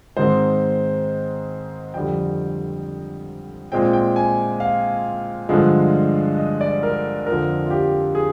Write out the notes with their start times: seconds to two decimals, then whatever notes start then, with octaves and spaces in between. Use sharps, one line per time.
0.17 G#2 D#3 G#3 C4 C5
1.94 F2 D3 G3 G5
3.72 A#2 G#3 C4 G5
3.93 G5
4.16 G#5
4.60 F5
5.49 G2 D3 F3 G#3
6.38 D#5
6.61 D5
6.83 A#4
7.27 F2 D3 F3 A#4
7.66 F4
7.71 G4
8.15 G#4